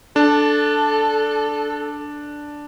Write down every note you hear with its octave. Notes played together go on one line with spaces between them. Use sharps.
D4 A4